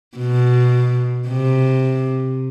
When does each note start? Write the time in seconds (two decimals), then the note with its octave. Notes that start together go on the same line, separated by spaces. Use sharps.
0.17 B2
1.27 C3